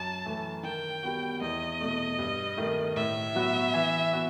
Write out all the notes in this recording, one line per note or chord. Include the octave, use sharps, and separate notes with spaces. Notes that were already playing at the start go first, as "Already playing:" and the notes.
Already playing: F#2 A5
E3 A3
D#3 G5
G3 B3 F#4
E2 D#5
B2 A3
G2
D#3 A3
A2 E5
F#3 B3 F#4
E3
B3 F#4